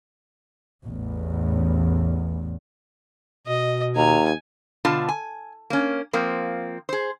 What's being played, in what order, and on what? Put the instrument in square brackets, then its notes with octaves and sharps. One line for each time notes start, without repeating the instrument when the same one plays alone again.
[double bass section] A1 E2
[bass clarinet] B2 [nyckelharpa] D#5
[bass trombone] D#2 [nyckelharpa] G#5 [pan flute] A#5
[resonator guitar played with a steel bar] B2 D3 F4 A5
G#5
A#3 C#4
F3 A#3 C4
G#4 C5